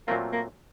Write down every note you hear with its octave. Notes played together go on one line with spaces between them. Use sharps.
A#2 F#3 A3 A#3 C4 F4
A#3